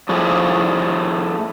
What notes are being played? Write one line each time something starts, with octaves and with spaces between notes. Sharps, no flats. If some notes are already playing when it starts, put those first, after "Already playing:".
A2 F3 A3 G#4